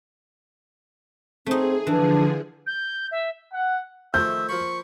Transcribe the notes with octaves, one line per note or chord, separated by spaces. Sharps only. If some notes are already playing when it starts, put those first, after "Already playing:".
A3 C4 D#4 G#4
D3 E3 F3 D4 G#4
G6
E5
F#5
D#3 F3 A3 E5 G6
F3 A#3 B5 C#6